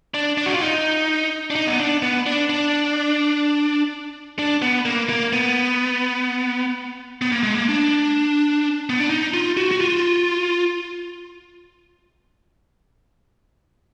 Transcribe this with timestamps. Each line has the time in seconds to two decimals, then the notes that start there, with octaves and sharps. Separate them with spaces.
0.14 D4
0.38 D4
0.46 F#4
0.54 F4
0.61 D#4
1.50 D4
1.55 D#4
1.67 B3
1.80 D4
2.02 B3
2.26 D4
2.49 D4
4.39 D4
4.62 B3
4.86 A#3
5.09 A#3
5.33 B3
7.22 B3
7.32 A#3
7.43 G#3
7.55 A#3
7.69 D4
8.89 B3
9.00 D4
9.10 D#4
9.34 F4
9.57 F#4
9.71 F#4
9.81 F4